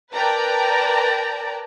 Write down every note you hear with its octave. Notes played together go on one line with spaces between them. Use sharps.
A#4 B4 D5 G5 A5 A#5